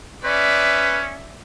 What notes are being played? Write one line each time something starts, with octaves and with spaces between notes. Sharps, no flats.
C#4 B4 D5 E5